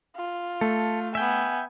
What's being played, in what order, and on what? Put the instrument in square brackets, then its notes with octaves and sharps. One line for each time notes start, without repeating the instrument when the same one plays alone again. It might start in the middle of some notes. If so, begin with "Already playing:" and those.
[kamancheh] F4
[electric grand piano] A3 [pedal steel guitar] A4
[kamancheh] B3 G#5 [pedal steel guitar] E5 G5